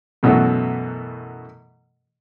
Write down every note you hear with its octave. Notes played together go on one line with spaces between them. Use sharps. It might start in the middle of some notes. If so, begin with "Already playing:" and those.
F#2 B2 E3 F#3 A3